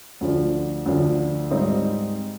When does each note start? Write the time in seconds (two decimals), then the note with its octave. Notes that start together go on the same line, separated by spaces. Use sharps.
0.21 D2 D3 F3
0.86 D2 D3 F3
1.51 G#2 G3 C4 D#4